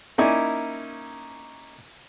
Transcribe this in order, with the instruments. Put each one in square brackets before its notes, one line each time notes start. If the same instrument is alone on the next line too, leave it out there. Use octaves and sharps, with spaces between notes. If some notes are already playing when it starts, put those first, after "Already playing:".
[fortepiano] A#3 C#4 D#4 E4 D5 G#5